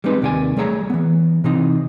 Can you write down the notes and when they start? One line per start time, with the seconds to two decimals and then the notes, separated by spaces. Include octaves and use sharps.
0.04 G3 G#3 C4 D#4 B4
0.21 D#2 C3 D#3 G4 D5 G#5
0.57 G3 A3 G#4 C#5 G#5 A#5
0.90 E3 B3
1.44 C3 E3 C4 D#4